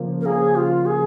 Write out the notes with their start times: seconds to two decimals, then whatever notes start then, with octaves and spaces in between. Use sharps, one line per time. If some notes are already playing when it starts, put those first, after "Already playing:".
Already playing: C#3 F3 A#3
0.21 A#4
0.26 C#3 F3 A#3 G#4
0.56 F4
0.86 G#4